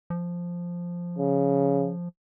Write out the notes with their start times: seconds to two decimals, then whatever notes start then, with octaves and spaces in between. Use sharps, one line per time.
0.10 F3
1.18 C#3